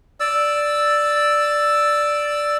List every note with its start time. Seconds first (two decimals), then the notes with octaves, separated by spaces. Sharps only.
0.20 D5 E6